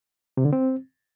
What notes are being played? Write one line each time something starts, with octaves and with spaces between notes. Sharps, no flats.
C3
D3
C4